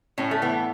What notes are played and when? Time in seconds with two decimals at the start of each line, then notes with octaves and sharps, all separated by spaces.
0.18 A2 C#4
0.31 A3
0.42 E3 B3